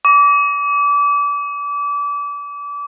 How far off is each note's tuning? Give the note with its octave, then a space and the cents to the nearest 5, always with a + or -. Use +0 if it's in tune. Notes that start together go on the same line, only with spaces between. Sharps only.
D6 -30